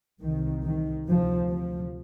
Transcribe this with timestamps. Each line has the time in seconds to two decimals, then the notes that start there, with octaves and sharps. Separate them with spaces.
0.21 C2 C3 D#3
0.63 D#3
1.06 D2 C3 F3
1.50 F3